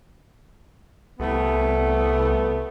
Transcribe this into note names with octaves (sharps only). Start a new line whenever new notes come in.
C2 A3 B3